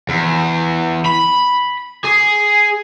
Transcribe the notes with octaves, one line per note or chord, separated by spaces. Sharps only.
E2
B5
G#4